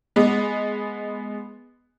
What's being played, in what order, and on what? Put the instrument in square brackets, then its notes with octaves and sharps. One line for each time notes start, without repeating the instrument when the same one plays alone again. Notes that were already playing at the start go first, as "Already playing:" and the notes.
[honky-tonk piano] G#3 B3